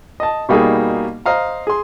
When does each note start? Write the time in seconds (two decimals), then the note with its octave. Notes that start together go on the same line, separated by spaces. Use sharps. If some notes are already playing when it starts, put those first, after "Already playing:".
0.20 D#5 A5
0.49 B2 G3 A#3 D#4 G#4
1.26 C5 D#5 F5 A#5
1.67 G#4 C6